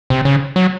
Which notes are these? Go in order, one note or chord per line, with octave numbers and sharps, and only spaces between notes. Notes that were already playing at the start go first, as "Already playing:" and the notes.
C3
C#3
F#3